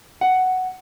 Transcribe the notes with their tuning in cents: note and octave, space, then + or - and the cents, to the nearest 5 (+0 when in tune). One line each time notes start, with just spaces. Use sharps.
F#5 +5